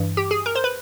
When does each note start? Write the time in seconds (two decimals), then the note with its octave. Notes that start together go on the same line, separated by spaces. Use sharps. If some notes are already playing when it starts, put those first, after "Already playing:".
Already playing: G2 E3
0.17 G4
0.31 G#4
0.46 A#4
0.55 C5
0.64 B4